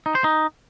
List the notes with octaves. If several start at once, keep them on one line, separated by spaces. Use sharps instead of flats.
D#4
C5
D#4